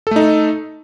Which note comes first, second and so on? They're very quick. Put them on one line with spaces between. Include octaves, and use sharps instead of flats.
A4 A3 D#4